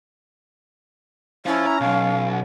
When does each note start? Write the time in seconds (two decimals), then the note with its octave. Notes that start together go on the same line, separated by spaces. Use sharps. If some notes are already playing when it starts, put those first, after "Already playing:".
1.46 C#4 E4 C5 F5
1.66 A#5
1.81 B1 F5
2.31 F#5